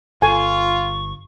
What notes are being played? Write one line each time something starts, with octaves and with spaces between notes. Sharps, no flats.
G1 F4 A4 G#5 C#6